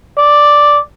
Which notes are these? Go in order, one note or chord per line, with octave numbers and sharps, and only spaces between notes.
D5